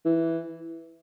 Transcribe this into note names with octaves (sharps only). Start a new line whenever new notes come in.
E3